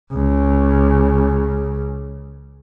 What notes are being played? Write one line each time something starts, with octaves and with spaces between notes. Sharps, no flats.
C#2 C#3